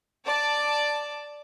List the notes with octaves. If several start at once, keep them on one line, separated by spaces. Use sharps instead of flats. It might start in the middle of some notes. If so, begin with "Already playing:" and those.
D5 A5